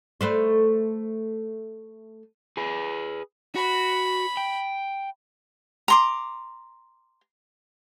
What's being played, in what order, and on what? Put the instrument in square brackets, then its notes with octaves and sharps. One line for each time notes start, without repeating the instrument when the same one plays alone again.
[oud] A3 B4 C5
[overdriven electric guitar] G#4 B4
[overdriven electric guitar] F#4 [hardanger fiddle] B5
[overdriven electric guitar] G5
[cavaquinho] A#5 C6 D6